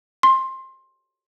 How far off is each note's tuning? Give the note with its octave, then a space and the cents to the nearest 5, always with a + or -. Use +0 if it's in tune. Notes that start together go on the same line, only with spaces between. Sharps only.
C6 +20